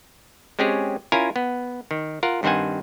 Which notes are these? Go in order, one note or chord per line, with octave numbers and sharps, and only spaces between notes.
G#3 C4 C#4 G4 G#4 C#5
C#4 E4 F4 A#4 G#5 A#5
B3
D#3
F4 A#4 F#5
G2 D#3 C4 C5 F#5 G#5